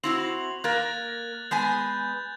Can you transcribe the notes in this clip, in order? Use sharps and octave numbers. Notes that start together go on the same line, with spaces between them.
C4 E4 F#4 F7 F#7
A#3 A#4 F#6 G#6 A6
G#3 B3 G#5 G6